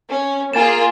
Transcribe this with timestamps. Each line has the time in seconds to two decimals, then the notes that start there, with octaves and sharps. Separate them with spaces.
0.10 C#4
0.53 A#3 F4 G#4 G#5 A6 E7